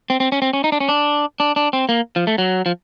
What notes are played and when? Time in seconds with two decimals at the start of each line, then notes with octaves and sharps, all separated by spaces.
0.10 C4
0.20 C4
0.32 C#4
0.42 C4
0.53 C#4
0.64 D#4
0.72 D4
0.80 C#4
0.89 D4
1.40 D4
1.56 D4
1.73 C4
1.89 A#3
2.16 F3
2.27 A3
2.38 F#3
2.66 F3